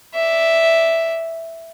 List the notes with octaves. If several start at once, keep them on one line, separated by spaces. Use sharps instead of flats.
D5 E5